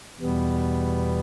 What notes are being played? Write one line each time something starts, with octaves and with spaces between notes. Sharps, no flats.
E2 B2 G3 B3